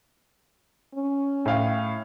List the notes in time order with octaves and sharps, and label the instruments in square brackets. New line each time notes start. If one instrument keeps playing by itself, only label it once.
[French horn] C#4
[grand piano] A2 F5 G5